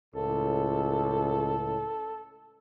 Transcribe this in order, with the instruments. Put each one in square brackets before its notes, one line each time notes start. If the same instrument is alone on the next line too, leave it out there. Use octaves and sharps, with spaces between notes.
[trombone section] C#2 A2 [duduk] A4